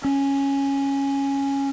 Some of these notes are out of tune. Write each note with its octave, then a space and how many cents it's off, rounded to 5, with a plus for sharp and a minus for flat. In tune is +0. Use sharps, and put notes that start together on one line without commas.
C#4 -5